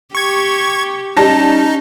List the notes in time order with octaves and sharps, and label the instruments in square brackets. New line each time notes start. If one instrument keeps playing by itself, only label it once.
[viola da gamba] G4 [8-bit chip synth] C#6 G#6
[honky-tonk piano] G3 A5 A#6 [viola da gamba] C#4 [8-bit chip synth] D#4